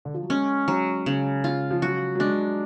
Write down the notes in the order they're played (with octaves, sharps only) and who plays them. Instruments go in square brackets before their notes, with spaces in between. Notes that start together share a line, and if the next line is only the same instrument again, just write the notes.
[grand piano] D3
F3
F#3
[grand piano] G#3 [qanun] C#4
[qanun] F#3
C#3
F4
[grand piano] F3
[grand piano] F#3 [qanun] F#4
[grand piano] F#3
[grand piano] G#3 [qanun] D4